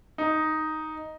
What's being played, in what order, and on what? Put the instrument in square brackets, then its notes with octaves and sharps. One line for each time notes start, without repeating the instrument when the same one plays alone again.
[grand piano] D#4